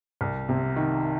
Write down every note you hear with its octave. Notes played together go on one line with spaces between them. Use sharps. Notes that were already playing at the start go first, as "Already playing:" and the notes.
C2
C3
D#3